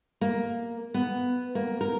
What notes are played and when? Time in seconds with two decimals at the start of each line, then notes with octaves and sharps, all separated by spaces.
0.21 A#3
0.94 B3
1.55 A#3
1.81 A#4